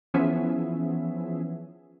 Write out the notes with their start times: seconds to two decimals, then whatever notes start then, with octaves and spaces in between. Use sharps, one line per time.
0.14 E3 F3 B3 C#4 G#4 E5